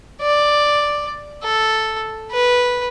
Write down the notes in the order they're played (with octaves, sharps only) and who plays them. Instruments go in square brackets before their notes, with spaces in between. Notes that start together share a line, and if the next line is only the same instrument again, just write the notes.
[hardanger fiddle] D5
A4
B4